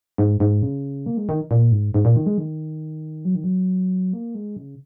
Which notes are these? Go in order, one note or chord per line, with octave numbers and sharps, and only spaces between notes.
G#2
G#2
C#3
A#3
G#3
D#3
A#2
G#2
G#2
A#2
D#3
G#3
D#3
F#3
D#3
F#3
A#3
G#3
C#3